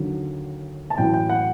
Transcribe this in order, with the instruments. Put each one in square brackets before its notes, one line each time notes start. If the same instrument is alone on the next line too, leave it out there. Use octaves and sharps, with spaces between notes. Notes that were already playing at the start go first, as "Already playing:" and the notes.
Already playing: [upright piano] D#2 D3 F#3
A5
A1 A2 F#3 G5
G5
F#5